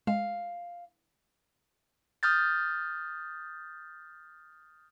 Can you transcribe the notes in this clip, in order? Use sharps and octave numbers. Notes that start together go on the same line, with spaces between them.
G#3 F5
D#6 F6 G6 A6